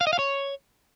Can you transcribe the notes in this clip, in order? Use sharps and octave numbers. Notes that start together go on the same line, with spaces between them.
F5
D#5
F5
C#5